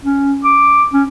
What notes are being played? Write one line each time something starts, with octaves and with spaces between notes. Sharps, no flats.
C#4
D6
C#4